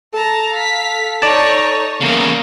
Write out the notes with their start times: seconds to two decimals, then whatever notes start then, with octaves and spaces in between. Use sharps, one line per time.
0.14 A4 A5 A#5
0.53 F5 B6
1.22 D#4 C#5 D5 A5
2.01 E2 C#3 A#3